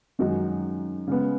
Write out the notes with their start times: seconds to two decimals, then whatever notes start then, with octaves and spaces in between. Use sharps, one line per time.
0.19 F#2 D#3 G#3 D#4 F#4
1.07 C#3 G#3 B3